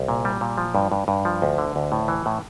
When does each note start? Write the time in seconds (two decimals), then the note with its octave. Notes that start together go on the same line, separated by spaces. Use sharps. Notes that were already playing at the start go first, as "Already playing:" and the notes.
Already playing: C2
0.08 A#2
0.25 G3
0.41 A#2
0.58 F3
0.75 G2
0.92 G2
1.08 G2
1.25 F3
1.42 D2
1.58 D3
1.76 D2
1.92 A2
2.08 E3
2.26 A2